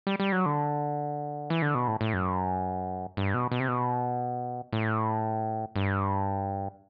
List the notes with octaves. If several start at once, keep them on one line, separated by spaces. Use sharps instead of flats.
G3
G3
F#3
D3
E3
D3
B2
A2
A2
F#2
G2
B2
B2
C3
B2
A2
G2